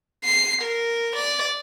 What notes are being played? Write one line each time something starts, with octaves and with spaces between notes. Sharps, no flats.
C7
A#4
D5